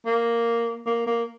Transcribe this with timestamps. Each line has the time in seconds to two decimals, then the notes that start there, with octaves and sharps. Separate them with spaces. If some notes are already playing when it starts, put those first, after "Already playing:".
0.06 A#3
0.86 A#3
1.07 A#3